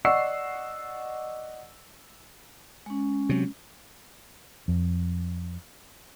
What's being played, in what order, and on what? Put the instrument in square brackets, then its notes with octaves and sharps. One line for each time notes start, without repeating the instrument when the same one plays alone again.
[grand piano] D5 D#5 F#5 C#6 E6 C7
[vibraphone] G#3 C#4
[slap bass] C3 F#3
[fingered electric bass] F2